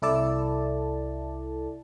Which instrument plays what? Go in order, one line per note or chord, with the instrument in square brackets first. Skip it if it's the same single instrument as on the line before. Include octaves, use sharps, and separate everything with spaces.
[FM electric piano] C2 E4 A4 D5 A5